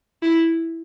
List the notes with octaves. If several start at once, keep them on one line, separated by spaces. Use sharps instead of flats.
E4